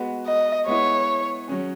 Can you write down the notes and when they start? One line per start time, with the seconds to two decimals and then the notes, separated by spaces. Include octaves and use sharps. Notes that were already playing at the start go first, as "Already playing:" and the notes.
Already playing: G#3 B3 F#4
0.26 D#5
0.67 G#3 B3 E4 C#5
1.48 F#3 C#4 G#4